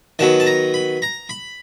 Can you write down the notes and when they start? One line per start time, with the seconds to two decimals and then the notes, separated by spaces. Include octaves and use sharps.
0.19 D#3 F#3 B3 A5
0.40 A5
0.46 A#5
0.74 B5
1.02 A#5
1.29 B5